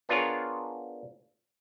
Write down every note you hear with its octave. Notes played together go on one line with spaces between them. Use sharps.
B3 D4 F4 G#4 A#4 C#5